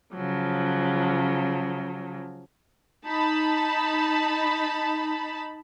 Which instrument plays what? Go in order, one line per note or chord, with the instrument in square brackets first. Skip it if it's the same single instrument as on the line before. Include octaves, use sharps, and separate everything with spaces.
[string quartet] C#3 F3 F#3
[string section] D#4 A5 B5